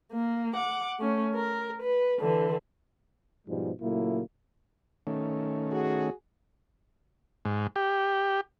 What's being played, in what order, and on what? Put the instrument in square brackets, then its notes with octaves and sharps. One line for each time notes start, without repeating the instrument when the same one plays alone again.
[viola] A#3
F#5 D6
A3 C#4
A#4
B4
D3 E3
[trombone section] G#2 B2 F3 G3 G#3
A#2 C#3 F#3 A3 A#3 E4
[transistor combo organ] D#3 A3 C#4
[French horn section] F#4 G#4
[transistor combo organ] G#2
G4